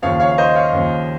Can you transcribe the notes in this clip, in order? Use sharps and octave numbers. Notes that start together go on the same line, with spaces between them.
D#2 C#3 F3 C#5 F5
C#5 F5
F5
C5 D#5
C#5 F5
D#2 C#3 F3